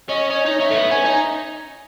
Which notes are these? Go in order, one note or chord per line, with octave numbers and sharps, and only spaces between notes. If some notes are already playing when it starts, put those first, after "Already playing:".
C#4 D#5
C#4 C#5
D#4
C#4 E5
A3
B3
C#4 G#5
D#4
G#5